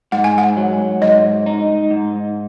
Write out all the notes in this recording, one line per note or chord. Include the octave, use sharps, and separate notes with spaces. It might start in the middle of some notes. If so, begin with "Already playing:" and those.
G#2 F#5
G#5
F#5
F#3
G#2 D#5
D#4
G#2